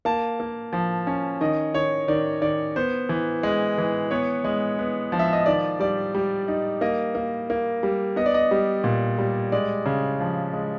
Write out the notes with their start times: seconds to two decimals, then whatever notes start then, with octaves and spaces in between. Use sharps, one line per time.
0.05 A#3 A5
0.40 A#3
0.73 F3
1.07 C#4
1.41 D#3 D#5
1.74 D#3 C#5
2.08 D#3 D5
2.42 D#3 D5
2.76 B3 C5
3.09 E3
3.43 G#3
3.78 E3
4.11 B3 C#5
4.44 G#3
4.79 B3
5.12 F3
5.19 E5
5.33 D#5
5.46 D#3 D5
5.80 G3 D5
6.15 G3
6.48 D#4
6.81 A#3 D#5
7.15 A#3
7.50 A#3
7.83 G3
8.16 B3 D#5
8.26 D5
8.34 D#5
8.51 G3
8.84 A#2
9.18 G3
9.52 G#3 D5
9.86 C#3
10.20 F3
10.53 G#3